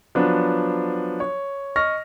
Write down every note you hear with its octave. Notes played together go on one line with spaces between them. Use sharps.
F3 F#3 B3 D4
C#5
D#5 C#6 F6 A#6